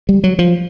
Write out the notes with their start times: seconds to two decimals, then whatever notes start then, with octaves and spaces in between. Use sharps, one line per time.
0.09 G3
0.24 F#3
0.39 F3